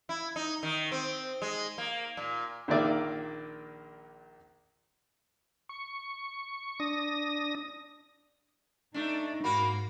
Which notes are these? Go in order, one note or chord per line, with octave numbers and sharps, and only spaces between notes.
E4
D#4
D#3
C4
G#3
A#3
A#2
A#1 A#2 D#3 A#3 D5 E5
C#6
D4 D#6 A#6
A3 D4 D#4
G#2 A#3 F#4 B5